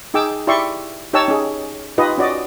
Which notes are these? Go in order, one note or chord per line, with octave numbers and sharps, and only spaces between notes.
D#4 G#4 G5 D6 E6
E4 G4 D5 E5 C6 C#6
D#4 G4 C#5 G5 A5 E6
C#4 D#4 G#4
D#4 F4 G4 B4 D#5
C#4 F#4 D5 D#5